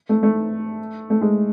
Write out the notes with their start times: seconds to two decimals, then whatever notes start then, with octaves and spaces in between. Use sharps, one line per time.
0.09 A3
0.23 A3
1.10 A3
1.21 G#3